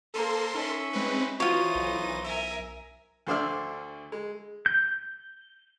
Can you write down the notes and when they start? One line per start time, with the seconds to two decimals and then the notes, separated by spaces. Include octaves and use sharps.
0.14 A#3 A4 A#4 C5 C6
0.55 C#4 D#4 E5
0.93 G#3 C4 B4
1.40 E3 D#4 F4 F#4 C5 C#5 D#7
1.75 B1
2.24 A#4 E5 G#5
3.27 D2 D3 C5 D5 E5 F6
4.12 G#3
4.66 G6